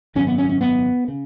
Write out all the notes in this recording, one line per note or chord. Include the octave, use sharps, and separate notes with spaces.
G#1 F#2 C#3 C#4
B3
C#4
C#4
B3
C#3